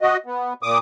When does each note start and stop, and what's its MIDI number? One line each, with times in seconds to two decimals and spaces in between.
0.01 0.17 66
0.01 0.17 75
0.26 0.53 59
0.63 0.78 46
0.63 0.78 86
0.63 0.78 87